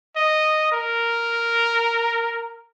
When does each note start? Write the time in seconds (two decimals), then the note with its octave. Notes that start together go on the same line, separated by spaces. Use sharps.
0.16 D#5
0.72 A#4